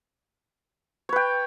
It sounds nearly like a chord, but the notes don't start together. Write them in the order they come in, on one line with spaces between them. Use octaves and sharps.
C#5 B4 G5